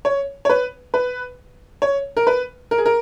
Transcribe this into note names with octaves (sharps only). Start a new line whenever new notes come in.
C#5
C#5
B4
B4
C#5
A#4
B4
A#4
G#4
A#4